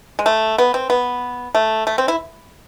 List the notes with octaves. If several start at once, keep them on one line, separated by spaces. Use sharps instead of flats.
G#3
A3
B3
C4
B3
A3
A3
C4
E4